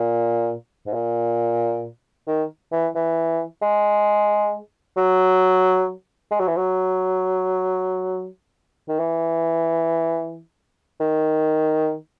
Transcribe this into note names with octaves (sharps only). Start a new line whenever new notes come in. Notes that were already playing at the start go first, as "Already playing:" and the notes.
Already playing: A#2
G#2
A#2
D#3
E3
E3
G#3
F#3
G#3
F#3
E3
F#3
D#3
E3
D#3